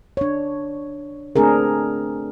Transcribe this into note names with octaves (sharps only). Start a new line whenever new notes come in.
D4 C#5
A3 C4 D4 G#4 A#4